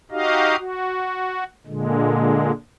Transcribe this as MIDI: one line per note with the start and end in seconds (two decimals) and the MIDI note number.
0.11 0.56 63
0.11 0.56 66
0.11 0.56 67
0.11 0.56 75
0.11 0.56 77
0.58 1.44 66
1.67 2.52 46
1.67 2.52 50
1.67 2.52 56